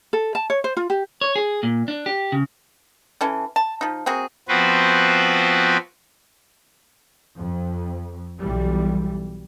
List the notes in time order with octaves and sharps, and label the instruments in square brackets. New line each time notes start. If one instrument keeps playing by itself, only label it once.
[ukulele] A4
A5
C#5
C5
F4
G4
[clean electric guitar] C#5
G#4
A#2
D4
G4
C#3
[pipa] E3 C#4 A4
A5
F3 D#4
A#3 C4 F#4 G#4
[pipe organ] F3 B3 C4 F#4 B4 C5
[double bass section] F2
B1 E3 G3